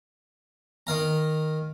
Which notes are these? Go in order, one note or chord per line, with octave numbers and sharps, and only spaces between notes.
D#3 F5 A#5